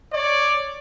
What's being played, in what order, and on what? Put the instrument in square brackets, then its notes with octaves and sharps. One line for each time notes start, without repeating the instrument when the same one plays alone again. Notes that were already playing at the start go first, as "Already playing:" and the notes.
[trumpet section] C#5 D5